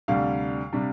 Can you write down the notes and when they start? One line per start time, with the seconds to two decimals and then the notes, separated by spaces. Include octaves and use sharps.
0.08 D2 C3 G3 D4 F5
0.73 C3 G3 D4